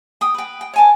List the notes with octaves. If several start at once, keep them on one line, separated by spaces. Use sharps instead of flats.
G5 D#6
B4 G5
G5
C#5 G#5 A5